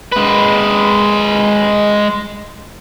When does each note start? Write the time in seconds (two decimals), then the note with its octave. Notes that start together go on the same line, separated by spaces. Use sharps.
0.12 G#3 B4